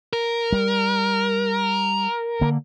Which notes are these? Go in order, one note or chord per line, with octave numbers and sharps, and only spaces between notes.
A#4
G3
D3 A#3